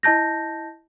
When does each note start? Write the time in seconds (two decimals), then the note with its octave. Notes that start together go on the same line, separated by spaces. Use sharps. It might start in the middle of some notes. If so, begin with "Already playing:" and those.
0.03 E4 D#5 A5 G6 A#6